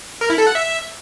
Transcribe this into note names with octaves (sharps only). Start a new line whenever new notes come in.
A#4
E4
A4
F#5
E5